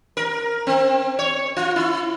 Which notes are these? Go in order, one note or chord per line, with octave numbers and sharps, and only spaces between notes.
A#4
C4
C#5
F4
E4